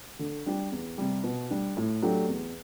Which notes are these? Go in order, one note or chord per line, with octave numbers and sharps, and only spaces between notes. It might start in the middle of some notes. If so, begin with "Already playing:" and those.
D3
G3 D4 G4
E2
C3 G3
B2
G3 D4
A2
F#3 A3 D4 G4
E2